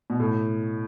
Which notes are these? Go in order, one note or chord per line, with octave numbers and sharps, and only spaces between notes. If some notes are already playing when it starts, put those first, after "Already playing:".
B2
A2